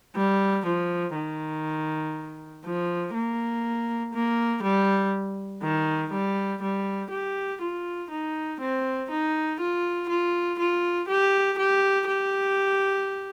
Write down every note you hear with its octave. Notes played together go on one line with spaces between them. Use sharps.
G3
F3
D#3
F3
A#3
A#3
G3
D#3
G3
G3
G4
F4
D#4
C4
D#4
F4
F4
F4
G4
G4
G4